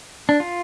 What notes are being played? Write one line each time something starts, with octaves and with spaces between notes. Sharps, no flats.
D4
F4